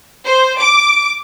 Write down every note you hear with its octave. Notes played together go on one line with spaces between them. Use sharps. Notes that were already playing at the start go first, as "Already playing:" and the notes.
C5
D6